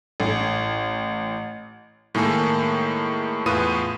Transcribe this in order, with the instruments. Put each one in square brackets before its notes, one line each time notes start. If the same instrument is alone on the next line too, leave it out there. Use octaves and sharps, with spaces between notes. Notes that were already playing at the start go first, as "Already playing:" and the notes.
[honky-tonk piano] A1
[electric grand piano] A2 D#3 G#3 A#3 G#4 A4
E2 A2 F4 B4 D#6 D#7